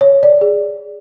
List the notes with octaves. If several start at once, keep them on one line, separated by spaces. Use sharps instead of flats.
C#5
D5
G#4